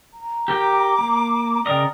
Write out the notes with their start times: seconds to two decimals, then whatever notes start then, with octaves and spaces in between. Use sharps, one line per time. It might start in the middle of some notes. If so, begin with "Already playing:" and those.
0.13 A#5
0.48 G4 A#4 G5 D6
0.98 A#3
1.66 C#3 A#4 D5 D#5 G5